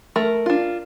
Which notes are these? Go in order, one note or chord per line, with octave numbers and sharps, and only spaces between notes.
A3 A#4
D4 F4